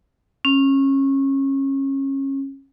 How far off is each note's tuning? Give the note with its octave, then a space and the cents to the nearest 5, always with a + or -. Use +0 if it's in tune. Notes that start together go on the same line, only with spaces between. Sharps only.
C#4 -25